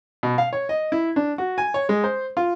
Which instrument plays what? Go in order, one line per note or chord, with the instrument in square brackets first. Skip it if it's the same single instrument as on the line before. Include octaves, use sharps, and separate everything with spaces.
[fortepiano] B2
F5
C#5
D#5
E4
D4
F#4
G#5
C#5
G#3
C5
F4